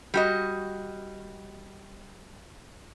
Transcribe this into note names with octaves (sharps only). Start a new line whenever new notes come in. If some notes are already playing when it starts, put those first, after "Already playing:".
G3 F#4 D#5